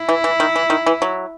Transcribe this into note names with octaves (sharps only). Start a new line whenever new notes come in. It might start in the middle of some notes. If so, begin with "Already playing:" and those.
Already playing: E4
E3
E3
D#3
E3
D#3
E3
F#3